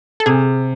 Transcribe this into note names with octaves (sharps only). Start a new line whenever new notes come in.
A4
C3 G#4